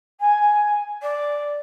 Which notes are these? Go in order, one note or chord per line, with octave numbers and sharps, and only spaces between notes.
G#5
D5